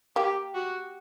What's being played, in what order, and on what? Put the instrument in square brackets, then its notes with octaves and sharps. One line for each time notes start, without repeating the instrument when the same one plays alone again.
[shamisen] A#3 [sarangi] G4
[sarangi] F#4